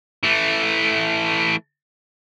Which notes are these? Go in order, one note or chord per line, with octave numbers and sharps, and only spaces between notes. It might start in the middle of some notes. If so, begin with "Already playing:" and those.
E3 A3